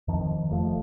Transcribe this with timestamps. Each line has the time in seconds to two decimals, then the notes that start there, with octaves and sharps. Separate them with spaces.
0.08 F2 D#3 F3
0.51 F1 F3 A3